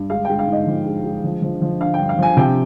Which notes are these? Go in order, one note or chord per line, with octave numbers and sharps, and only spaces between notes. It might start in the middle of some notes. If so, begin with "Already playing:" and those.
Already playing: G2
G#3 F5
G#3 G5
F5
G#2
D#5
F3
G#3
G#3
F3
F3
F3
D3 F5
G2 G5
F5
F3 G#5
C3 G5